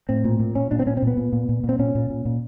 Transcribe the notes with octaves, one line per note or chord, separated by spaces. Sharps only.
A2 C4
A#2
A#2
A#2 C#4
A#2 D4
C4
A#2 C#4
C4
A#2 B3
A#2
A#2
A#2
A#2
C4
A#2 C#4
A#2
A#2
A#2